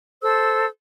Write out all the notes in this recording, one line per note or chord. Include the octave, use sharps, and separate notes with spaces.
A4 C5 E6